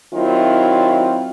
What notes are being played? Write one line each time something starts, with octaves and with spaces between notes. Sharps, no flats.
D#3 F#3 C4 E4 F4